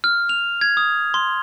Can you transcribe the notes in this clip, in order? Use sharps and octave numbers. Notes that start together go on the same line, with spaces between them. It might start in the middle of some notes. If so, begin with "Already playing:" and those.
F6
F7
G#6
D#6
C6